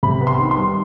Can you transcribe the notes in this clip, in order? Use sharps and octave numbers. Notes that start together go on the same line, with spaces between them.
C3 B5
B3
C6
D#3
C6
G3